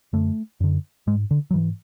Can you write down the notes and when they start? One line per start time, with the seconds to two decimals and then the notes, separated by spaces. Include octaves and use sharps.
0.13 F#2 D3 A3
0.60 F#2 D3
1.07 G#2 G#3
1.31 D3
1.51 F#3
1.54 G#2 E3